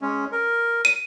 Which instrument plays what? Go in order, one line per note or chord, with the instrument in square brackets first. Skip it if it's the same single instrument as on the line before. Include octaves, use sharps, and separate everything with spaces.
[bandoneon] G#3 C#4
A#4
[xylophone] D#7